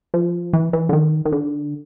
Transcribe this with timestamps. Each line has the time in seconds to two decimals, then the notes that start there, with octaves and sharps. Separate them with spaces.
0.14 F3
0.53 E3
0.73 E3
0.89 D3
0.93 D#3
1.25 D#3
1.32 D3